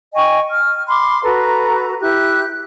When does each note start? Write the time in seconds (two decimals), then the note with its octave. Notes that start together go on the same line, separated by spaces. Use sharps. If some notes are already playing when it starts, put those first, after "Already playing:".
0.14 D#5 G5 G#5 C#6
0.50 F6
0.87 B5 C6 D6
1.24 F#4 A4 B4 A#5
2.00 E4 G4 F#6